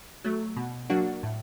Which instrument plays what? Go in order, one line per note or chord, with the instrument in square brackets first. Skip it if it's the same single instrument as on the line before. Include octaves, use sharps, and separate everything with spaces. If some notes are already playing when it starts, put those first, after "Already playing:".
[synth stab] F#3 A3
B2
F#3 A#3 D4 F#4
A2